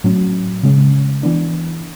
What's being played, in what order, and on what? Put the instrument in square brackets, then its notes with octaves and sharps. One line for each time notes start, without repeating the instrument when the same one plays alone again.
[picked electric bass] A2 F#3 C#4
C#3 G#3 C#4
E3 B3 D4